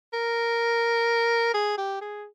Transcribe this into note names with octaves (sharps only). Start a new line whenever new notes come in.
A#4
G#4
G4
G#4